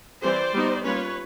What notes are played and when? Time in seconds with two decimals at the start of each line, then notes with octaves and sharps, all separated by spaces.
0.22 E3 G3 C4 C5 D5
0.53 G3 B3 D#4
0.84 G3 A#3 C#4 F4 B4 C#5